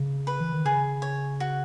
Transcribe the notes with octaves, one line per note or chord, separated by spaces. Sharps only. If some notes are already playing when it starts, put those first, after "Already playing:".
Already playing: C#3
B4
E3
D#3
C#3 G#4
C#5
F#4